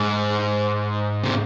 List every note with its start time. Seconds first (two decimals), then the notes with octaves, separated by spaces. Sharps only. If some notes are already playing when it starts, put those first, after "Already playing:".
Already playing: G#2
1.24 C3